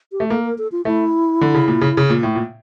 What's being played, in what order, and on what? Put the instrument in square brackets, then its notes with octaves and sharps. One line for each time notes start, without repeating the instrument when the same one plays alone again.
[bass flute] G4
[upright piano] A3
[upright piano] A#3 [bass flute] A4
[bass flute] A#4
A4
F4
[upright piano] A3 [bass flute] E4
[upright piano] D3
C#3
A#2
C#3
C#3
A#2
A2
A#2